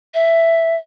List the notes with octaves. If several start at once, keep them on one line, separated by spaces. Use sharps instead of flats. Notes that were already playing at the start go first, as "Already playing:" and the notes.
E5